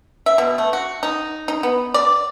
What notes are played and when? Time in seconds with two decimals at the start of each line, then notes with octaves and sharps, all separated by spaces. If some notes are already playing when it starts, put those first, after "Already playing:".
0.26 E5
0.38 B2
0.58 A3
0.73 F#4
1.03 D#4
1.48 D#4
1.63 B3
1.94 D5